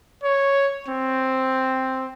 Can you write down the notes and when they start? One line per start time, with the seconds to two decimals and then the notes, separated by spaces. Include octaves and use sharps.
0.23 C#5
0.88 C4